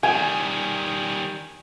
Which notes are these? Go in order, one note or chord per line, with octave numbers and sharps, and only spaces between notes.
D#3 G3 G#5